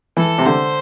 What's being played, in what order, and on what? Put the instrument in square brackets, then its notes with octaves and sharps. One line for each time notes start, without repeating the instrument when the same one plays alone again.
[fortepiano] E3 [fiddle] A4
[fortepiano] C3
[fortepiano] D3 [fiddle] C5